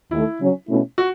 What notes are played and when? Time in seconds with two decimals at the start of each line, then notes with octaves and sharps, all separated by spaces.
0.11 D#2 D#3 A3 E4
0.40 C#3 F#3 C#4
0.68 B2 A3 C#4 E4
0.98 F#4